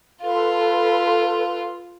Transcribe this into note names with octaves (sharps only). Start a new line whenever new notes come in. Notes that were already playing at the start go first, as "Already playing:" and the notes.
F4 A4 B4 C6